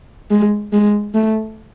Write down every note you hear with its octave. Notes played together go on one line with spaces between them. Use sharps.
G#3
G#3
A3